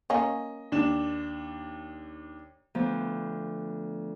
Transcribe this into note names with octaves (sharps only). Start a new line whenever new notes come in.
A#3 C#4 D#5
D#2 D4 E7
D2 F3 B3 C5